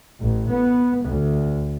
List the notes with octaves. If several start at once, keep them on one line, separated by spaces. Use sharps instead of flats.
A1
B3
D2